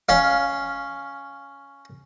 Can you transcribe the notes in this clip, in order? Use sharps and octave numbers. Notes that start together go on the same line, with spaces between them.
C#4 F5